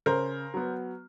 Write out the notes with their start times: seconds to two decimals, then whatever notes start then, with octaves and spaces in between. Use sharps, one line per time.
0.06 C#3 A#4 C5
0.54 F#3 B3